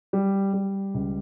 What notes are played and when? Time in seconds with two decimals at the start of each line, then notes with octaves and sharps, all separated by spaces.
0.13 G3
0.53 G3
0.94 C#2